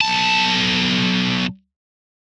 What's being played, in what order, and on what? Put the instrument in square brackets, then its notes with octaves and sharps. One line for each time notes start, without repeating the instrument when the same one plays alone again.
[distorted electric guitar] B1 A5